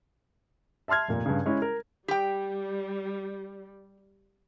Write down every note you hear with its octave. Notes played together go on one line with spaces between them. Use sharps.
E5 A5 C6 F6 G#6
F1 A#2
G2 C#3
G#3 C#4 E4 D#5
A#4
G3 G4 G5